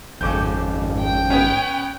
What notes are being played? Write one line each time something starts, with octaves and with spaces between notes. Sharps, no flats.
G#1 F2 C#3 D6 G6
G5
B3 C#4